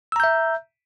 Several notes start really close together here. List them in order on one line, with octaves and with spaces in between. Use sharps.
E6 A#5 G6 E5